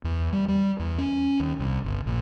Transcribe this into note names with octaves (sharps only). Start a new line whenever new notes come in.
E2
G3
G3
E2
C#4
D#2
C2
G1
A#1